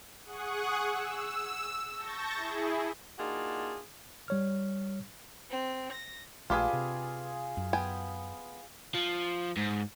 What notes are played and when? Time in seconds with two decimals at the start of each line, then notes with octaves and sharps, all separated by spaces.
0.24 G#4 F#5 C#6 D#6 F#6
0.83 E6
1.93 A5 C#6 G6 A6 A#6
2.35 E4 G#4
3.18 A#3 D4 D#4 F4 F#4 G#4
4.28 G3 C#5 F6
5.50 C4
5.93 A#6
6.50 A#1 A3 D4 F4 G4 G#4 B4
6.73 C3
7.57 F#2
7.73 B3 G5 G#5
8.95 F3
9.57 G#2